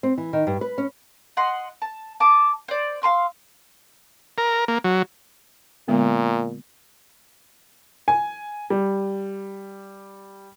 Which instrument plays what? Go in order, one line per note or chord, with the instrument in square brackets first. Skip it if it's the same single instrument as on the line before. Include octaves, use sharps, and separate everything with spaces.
[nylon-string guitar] C4
E3
D#3
G2
B4
C#4
[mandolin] D#5 F#5 C6
A5
A5 D6 D#6
C5 D5
F5 A5 C6 E6
[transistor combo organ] A#4
A#3
F#3
[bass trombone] A#2 [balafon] D3 G#3 B3
[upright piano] G#5
G3